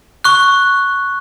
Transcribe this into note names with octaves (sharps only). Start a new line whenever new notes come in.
C#6 F#6